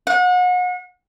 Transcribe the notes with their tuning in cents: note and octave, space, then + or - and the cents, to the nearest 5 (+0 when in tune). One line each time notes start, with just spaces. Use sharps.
F#5 -35